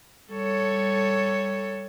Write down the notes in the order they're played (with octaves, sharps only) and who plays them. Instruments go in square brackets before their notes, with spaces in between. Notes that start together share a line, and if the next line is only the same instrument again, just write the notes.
[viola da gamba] G3 A4 C#5